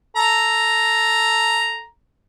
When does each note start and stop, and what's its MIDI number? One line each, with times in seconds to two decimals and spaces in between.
0.17 1.85 69
0.17 1.85 82